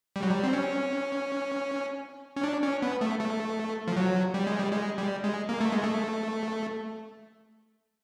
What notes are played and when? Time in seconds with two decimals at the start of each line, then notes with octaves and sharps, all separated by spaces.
0.16 G3
0.23 F#3
0.29 G3
0.43 C4
0.53 C#4
2.36 C#4
2.44 D4
2.63 C#4
2.82 B3
3.01 A3
3.20 A3
3.88 F3
3.96 F#3
4.34 G3
4.47 G#3
4.59 G3
4.72 G#3
4.98 G3
5.24 G#3
5.49 A#3
5.61 A3
5.72 G#3
5.84 A3